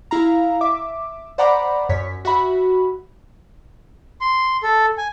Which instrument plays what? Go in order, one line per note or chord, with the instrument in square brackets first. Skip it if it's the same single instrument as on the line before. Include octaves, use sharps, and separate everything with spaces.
[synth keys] E4 F5 A#5
E5 D6
C5 D5 F#5 A#5 B5 D6
F#2 C#5 B6
F#4 E5 B5
[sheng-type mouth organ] C6
A4
G#5